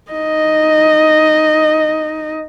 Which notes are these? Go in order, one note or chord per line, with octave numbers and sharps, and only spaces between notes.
D#4 D#5